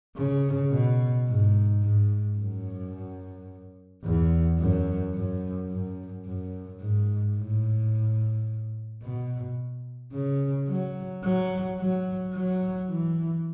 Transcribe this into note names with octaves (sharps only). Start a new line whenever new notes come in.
C#3
B2
G#2
G#2
F#2
E2
F#2
F#2
F#2
F#2
G#2
A2
B2
C#3
F#3
F#3
F#3
F#3
E3